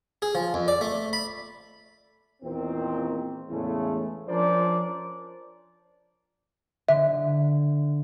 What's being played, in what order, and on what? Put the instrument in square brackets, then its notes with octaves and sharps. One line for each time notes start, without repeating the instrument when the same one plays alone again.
[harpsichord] G#4
F3
F2
D5
A3
B5
[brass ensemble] E2 A#2 D#3 C4
E2 A2 C#3 G#3 A3
F3 C#4 D4 A#4 C5 D5
[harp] D3 [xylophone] E5